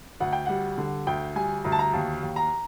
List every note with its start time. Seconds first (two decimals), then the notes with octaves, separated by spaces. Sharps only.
0.20 D2 F#5
0.33 G5
0.46 G3 F#5
0.78 D3
1.07 D2 G5
1.35 G3 G#5
1.64 D2 A#5
1.72 A5
1.79 A#5
1.93 D#2 A5
2.22 D#2
2.36 A#5